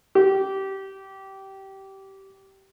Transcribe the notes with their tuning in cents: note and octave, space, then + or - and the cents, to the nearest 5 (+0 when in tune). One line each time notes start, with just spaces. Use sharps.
G4 -20